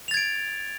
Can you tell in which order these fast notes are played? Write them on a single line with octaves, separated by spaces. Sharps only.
F7 A6 G#6 D7